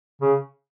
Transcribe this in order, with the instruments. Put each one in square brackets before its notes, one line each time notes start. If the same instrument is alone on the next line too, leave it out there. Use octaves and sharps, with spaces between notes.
[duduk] C#3